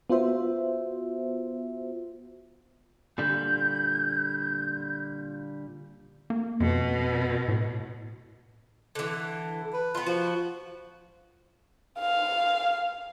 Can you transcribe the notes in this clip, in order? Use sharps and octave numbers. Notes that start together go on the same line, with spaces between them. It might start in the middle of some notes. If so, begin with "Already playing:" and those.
B3 F4 F#4 C5 E5
A#2 D3 G3 G6
A#3
F2 B2
A2
D3 E3
B4
B3 F4
F3 F#4
F5